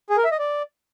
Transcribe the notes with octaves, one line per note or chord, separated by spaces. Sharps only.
G#4
A#4
E5
D#5
D5